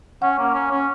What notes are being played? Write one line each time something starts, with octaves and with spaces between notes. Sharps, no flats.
C#4 F#5
A#3
C#4
C#4